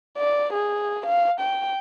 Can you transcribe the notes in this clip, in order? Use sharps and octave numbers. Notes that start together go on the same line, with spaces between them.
D5
G#4
F5
G5